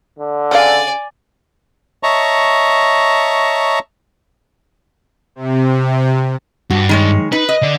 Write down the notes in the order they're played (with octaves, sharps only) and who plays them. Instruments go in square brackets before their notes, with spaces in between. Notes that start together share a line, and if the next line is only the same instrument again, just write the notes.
[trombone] D3
[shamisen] C#3 F5 [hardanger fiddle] D5 G#5
[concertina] C#5 D#5 E5 A5 A#5 C#6
[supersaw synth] C3
[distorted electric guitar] G2 [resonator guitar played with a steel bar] F#4
[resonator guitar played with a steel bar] D#3 G#3 C#5
[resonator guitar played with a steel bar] D#4 [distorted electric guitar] B4
[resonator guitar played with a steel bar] D#5
[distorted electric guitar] D3 D4